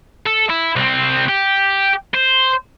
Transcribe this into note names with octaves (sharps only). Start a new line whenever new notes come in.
A4
E4
C2 C4
G4
C5